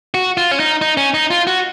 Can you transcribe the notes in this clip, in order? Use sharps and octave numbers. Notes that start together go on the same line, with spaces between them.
F#4
F4
C#4
D#4
D#4
C#4
D#4
F4
F#4